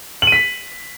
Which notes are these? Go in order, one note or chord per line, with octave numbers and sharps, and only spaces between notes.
F#7
D#7
B6